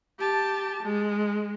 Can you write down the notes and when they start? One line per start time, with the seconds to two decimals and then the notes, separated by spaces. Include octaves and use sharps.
0.20 G4 A5
0.83 G#3